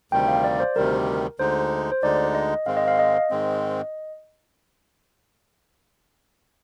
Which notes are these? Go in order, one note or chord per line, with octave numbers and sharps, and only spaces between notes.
D2 C3 D#3 G3 G5
F5
D5
C5
D2 C3 D#3 G3 A#4
D2 D3 G#3 D#4 C5
C5
D2 D3 G#3 D#4 D5
D#5
G#2 D#3 G#3 C4 F5
D#5
F5
D#5
G#2 D#3 G#3 C4